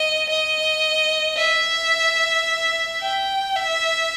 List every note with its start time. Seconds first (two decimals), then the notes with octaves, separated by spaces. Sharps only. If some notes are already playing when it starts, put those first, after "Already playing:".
Already playing: D#5
0.29 D#5
1.38 E5
3.01 G5
3.56 E5